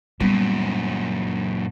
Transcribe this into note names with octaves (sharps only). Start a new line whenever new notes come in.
F#2 A#2 G3 B3